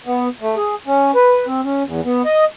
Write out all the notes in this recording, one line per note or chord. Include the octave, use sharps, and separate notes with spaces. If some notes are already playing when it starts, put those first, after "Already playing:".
B3
A3
G#4
C#4
B4
C4
C#4
E2
B3
D#5